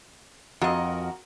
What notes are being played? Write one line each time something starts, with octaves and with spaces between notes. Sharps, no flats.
F2 F#4 A#4 D#5